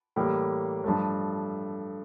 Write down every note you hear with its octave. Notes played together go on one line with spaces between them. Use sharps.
A2 E3 G3 A#3
G2 F3 A3